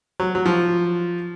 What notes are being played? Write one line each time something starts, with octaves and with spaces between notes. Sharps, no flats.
F#3
F#3
F3